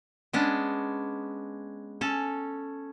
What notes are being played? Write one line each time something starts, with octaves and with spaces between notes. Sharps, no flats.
G#3 B3 C#4 D4
C#4 A4